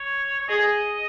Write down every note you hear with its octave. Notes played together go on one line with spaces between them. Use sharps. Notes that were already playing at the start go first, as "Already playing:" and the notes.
Already playing: C#5
C#5
G#4 D#5